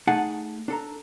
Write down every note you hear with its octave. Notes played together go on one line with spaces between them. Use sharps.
A3 D#4 G#4 F#5 G#5 A5
D4 A4 A#5